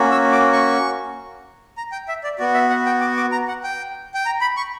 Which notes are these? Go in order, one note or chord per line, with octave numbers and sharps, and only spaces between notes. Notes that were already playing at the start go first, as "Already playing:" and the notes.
Already playing: A#3 C#4 F#4
E6
D6
C#6
A#5
G5
E5
D5
B3 F#4 D5
E5
F#5
G5
D6
D6
A#5
F#5
G5
G5
A#5
B5
C#6